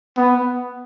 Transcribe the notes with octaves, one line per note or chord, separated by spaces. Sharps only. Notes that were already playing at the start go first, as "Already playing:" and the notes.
B3